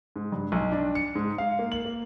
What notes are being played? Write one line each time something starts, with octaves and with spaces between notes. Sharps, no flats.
G#2
G2
B1
D4
C#7
G#2
F5
A#3
F#7
A#3